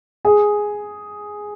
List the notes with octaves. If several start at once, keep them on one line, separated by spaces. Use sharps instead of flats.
G#4